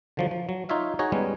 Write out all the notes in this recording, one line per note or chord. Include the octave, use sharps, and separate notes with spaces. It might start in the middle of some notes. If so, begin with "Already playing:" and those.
D3 F3 F#3
F3
F#3
D#4 F4 C#5 E5 F5
D#4 F#4 G#4 C#5 D#5
G3 G#3 B3 C#4